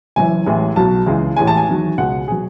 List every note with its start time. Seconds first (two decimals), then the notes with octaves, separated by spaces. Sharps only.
0.16 F#1 F#2 E3 G#5
0.46 A1 A2 E3 G#3
0.76 B1 B2 F#3 A5
1.06 C#2 C#3 E3 G#3
1.36 A1 A2 E3 G#3 G#5
1.47 A5
1.57 G#5
1.67 E2 D#3 F#3
1.98 C#2 B2 G#3 F#5
2.28 B2 F#3 G#4